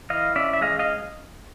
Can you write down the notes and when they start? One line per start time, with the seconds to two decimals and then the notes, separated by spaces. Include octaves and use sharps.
0.10 E3 D#5 F5
0.36 C#4 D5 E5
0.53 E5
0.61 G#3 D#5 F5
0.79 D#5 F5